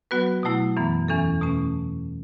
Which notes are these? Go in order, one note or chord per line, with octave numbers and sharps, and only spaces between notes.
F#3 B3 F#4 B4
B2 F#3 A3 E4
F#2 E3 B3
E2 E3 C#4 A4
B2 A3 C#4